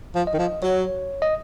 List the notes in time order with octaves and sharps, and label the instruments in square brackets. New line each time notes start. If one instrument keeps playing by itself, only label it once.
[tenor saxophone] F3
[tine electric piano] D#5
[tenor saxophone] D#3
F3
[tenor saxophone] F#3 [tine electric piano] C#5
[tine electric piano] D#5